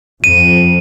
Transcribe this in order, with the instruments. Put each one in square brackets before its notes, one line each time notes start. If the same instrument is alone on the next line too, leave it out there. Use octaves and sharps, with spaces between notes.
[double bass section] F2 [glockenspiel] D#7